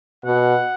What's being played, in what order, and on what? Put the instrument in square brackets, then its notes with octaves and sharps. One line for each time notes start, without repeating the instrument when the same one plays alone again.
[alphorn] B2 [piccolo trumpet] F#5